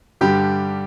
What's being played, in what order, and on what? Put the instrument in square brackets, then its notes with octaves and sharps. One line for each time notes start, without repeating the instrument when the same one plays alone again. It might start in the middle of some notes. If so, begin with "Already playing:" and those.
[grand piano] G2 D3 G3 G4